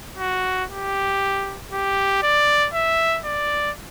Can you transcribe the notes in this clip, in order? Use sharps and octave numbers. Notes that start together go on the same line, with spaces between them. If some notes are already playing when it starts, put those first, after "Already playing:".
F#4
G4
G4
D5
E5
D5